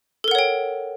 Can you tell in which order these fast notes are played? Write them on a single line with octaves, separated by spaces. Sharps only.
A4 A#4 F#5 C#5 G5